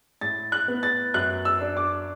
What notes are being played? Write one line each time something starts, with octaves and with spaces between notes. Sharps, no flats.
A2 A6
F#6
B3
A6
F#2 F#6
E6
D4
D6